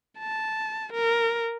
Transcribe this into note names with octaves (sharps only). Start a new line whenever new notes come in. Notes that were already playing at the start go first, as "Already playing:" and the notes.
A5
A#4